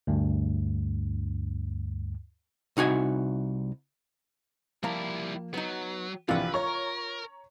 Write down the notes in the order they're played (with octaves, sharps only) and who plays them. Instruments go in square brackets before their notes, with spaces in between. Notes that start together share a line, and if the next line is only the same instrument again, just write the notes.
[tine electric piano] D2 G2
[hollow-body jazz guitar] C2 D#4 F#4 G#5
[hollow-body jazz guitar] F3 A#3 A#5 [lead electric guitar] G3 E4
[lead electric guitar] F#3 [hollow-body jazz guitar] B3 D#4
[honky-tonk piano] A#1 C3 E3 [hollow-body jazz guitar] F4 F#5 [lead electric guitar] B4
[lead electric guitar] A#4 [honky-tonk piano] C#5 A#5 C#6